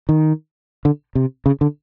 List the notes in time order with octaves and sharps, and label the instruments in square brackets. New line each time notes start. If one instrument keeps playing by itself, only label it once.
[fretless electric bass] D#3
D3
C3
C#3
D3